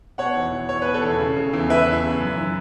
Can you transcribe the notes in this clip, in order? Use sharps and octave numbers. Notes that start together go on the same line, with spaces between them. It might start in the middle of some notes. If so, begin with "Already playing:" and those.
B2 C#5 F#5
E2
E2
E2 C#5
B2 B4
A4 C#5
E2
C#3
C#3
E2
E2 B4 E5
E2
C#3
F#2
E3